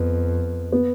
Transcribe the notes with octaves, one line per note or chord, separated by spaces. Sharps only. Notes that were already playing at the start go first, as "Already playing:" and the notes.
Already playing: F2 B3
B3